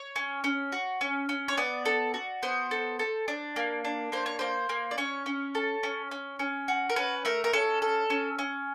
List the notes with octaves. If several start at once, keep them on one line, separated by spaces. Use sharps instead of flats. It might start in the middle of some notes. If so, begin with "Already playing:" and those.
Already playing: C#5
C#4
C#4
F#4
C#4
C#4
C#5
B3 D5
A4
F#4
B3 C5
A4
A4
D4
A#3
D4
A#3 C5
C#5
A#3 C5
A#3
D5
C#4 C#5
C#4
A4
C#4
C#4
C#4
F#4
A#4
C#4 B4
A3 A#4
A#4
C#4 A4
A4
C#4
C#4